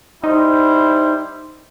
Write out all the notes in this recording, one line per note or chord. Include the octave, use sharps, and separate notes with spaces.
G3 D#4 E4 C5